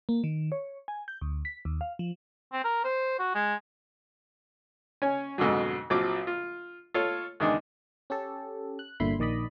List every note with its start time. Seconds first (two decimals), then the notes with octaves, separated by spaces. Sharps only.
0.09 A#3
0.24 D#3
0.52 C#5
0.88 G#5
1.08 G6
1.21 D2
1.45 B6
1.65 D#2
1.81 F5
1.99 F3
2.53 C4
2.64 A#4
2.84 C5
3.19 F#4
3.35 G#3
5.02 C#4 C#5 G#5
5.38 F2 G#2 B2 D3 F#3
5.90 A#1 F3 F#3 C4 D6
6.27 F4
6.94 F4 A4 C#5
7.40 E2 D#3 G#3 D4 D#4
8.10 C#4 G4 A4
8.79 F#6
9.00 G1 A#2 D3 E4 B5 C6
9.19 A#1 D#3 D5 D#5 B5